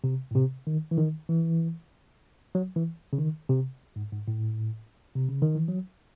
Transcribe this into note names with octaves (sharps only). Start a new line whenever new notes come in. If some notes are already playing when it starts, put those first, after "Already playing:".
C3
A2
C3
D#3
E3
D#3
E3
F#3
E3
C#3
D#3
C3
G#2
G#2
A2
C3
C#3
D#3
E3
F#3